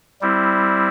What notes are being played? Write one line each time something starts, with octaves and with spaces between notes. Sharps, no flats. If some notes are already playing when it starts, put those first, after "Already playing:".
G3 C4 E4